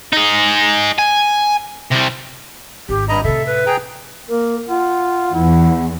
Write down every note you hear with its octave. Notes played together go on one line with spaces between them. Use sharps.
D#4 G#4
G#5
C3 G3
G#1 G4
G2 D#5 A#5 B5
A2 C3 A4 E5
B4
G#4 G5 A#5
A#3 A#4
F4 F#5
E2 E4